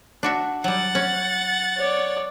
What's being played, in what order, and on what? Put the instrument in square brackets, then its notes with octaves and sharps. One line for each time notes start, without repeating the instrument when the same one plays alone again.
[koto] D4 F#4 E5
[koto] F#3 G3 [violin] F#5 A6
[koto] C#4
[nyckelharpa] C#5 D5